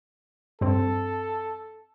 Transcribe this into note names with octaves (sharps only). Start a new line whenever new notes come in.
G2 C4 A4